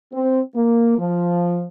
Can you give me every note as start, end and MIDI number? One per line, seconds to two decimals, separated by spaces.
0.13 0.40 60
0.55 0.96 58
0.98 1.65 53